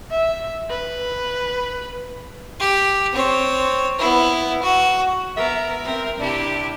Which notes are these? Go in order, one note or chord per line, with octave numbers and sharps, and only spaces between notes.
E5
B4
G4
C4 C#5
B3 E4
F#4
B3 A#4 E5
C4 A#4
C3 D4 E4 G4